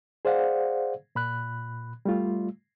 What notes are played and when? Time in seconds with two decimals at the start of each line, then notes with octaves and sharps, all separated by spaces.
0.25 G#4 C5 D5 F5 F#5
1.15 A#2 B5 F#6
2.05 G3 A3 F4